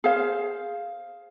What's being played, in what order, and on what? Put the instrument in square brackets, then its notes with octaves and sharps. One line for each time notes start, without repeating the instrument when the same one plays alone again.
[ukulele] G#4 C5 F5